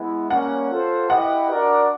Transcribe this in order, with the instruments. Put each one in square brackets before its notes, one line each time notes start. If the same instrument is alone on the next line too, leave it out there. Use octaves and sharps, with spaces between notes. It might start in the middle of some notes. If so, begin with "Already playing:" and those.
Already playing: [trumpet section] G#3 B3 E4
[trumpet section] G3 A#3 C#4 [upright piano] F#5
[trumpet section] F4 A4 C5
[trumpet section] E4 G4 B4 D#5 [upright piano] F#5
[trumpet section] D4 F#4 A#4 D5